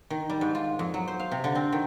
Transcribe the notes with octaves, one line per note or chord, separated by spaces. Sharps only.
D#3
G3
G#2
F4
F2
F#3
C5
F5
C3
D3
C4
D#3